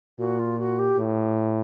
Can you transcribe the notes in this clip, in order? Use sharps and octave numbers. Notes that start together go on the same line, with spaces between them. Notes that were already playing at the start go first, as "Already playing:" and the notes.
A#2 F#4
F4
F#4
G4
A2